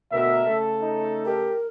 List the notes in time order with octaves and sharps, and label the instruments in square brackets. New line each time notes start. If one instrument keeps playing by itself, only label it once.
[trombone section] D2 B2 A#4 [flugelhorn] E5
[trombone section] C#3 A3 A4
[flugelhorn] D#4
[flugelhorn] G4 [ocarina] A#4